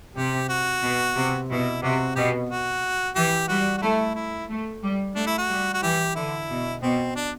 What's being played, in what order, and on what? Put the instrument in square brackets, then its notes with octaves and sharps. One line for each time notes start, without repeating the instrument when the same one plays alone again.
[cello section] C3 [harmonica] G4
[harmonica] F#4
[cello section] B2
C3
[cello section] B2 [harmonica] E4
[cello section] C3 [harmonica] F#4
[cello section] B2 [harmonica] G4
[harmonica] F#4
[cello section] E3 [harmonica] G4
[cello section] G3 [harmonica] F#4
[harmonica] F#4
[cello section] A3 [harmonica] E4
[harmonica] E4
[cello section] A3
G3
[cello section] A3 [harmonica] D4
[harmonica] E4
F#4
[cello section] G3
[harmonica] F#4
[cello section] E3 [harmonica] G4
[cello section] D3 [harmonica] E4
[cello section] B2
[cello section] B2 [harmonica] C4
[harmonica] D4